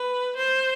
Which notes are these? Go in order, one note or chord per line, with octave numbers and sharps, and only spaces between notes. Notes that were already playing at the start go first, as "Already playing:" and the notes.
Already playing: B4
C5